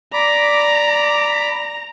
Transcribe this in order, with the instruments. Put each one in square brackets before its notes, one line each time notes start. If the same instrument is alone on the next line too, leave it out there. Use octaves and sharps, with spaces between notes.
[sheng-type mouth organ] D5 B5 D6 [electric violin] A#5